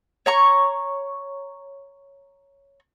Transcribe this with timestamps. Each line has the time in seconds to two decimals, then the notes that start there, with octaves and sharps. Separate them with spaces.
0.26 C#5 A#5 C#6